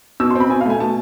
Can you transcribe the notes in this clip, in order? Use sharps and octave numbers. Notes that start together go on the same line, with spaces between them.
B2 E6
C6
C4 B5
B2 G#5
F5
A3 G#5
B2 A5